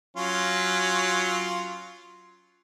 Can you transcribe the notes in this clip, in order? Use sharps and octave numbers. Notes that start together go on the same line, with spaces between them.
F#3 C#4 F4